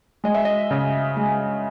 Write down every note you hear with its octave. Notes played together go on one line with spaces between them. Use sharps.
G#3 D#5
E5
D#5
C#3
G#3